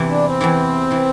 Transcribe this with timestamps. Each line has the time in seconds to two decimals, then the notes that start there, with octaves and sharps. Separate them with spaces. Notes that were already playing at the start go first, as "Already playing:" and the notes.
Already playing: E2 C3 E3
0.08 D4
0.24 C4
0.41 E2 C3 E3
0.91 C3 E3